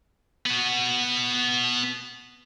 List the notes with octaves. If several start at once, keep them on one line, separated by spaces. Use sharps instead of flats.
B3 F#4